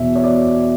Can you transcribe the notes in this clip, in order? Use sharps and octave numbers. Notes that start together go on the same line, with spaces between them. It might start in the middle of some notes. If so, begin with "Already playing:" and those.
Already playing: E2 B2 E5
C#5
D5